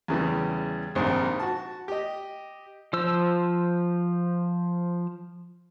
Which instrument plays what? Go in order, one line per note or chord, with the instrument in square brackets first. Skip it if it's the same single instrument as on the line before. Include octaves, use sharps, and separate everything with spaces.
[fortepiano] E2 C#3 E3 G3
A#1 G#2 C3 D#3 F5
F#4 A5
G4 D#5
[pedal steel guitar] F3 C5 E6